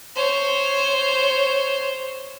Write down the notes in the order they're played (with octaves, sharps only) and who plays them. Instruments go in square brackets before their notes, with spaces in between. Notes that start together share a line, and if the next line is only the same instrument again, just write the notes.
[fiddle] C5 C#5